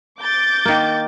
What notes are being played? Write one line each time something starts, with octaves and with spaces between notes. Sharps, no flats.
D6 G6 A6
D#3 A#3